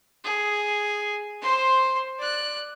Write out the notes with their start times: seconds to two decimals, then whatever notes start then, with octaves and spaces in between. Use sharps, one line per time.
0.24 G#4
1.42 C5 C6
2.19 D5 F#6